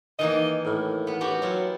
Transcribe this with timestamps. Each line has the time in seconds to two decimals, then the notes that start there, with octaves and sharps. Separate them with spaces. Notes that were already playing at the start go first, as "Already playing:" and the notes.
0.19 D#3 E3 A#3 D#5
0.65 A2
1.07 B3 B4
1.21 C#4 F#4 G4
1.42 F#3 E4 F4